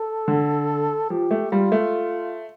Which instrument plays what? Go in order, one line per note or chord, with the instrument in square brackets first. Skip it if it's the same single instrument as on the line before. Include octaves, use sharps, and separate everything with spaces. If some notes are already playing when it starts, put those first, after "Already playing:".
Already playing: [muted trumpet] A4
[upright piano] D3
[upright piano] F3 [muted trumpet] G4
[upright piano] A3
[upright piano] G3 [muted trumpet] F4
[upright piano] A3